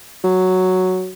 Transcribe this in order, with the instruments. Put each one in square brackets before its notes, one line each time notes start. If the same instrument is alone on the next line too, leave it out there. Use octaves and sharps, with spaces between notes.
[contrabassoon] F#3